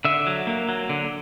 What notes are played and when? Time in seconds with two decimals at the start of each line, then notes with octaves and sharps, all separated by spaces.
0.05 D3 E5
0.27 F#3
0.47 A#3
0.69 F#3
0.89 D3